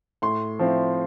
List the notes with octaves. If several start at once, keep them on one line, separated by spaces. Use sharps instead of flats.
A2 C6
F3 C4 E4